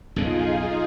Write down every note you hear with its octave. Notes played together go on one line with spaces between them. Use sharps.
B1 F2 C#3 D#4 F4 G#4